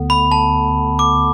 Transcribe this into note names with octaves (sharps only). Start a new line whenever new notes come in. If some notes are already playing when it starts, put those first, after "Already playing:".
Already playing: D2 D3 B3
B5
A5
D6